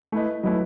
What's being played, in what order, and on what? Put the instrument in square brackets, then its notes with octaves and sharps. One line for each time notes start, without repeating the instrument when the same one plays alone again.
[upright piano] A3 E4 B4 D#5
[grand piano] F#3 [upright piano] A3 E4 B4 D#5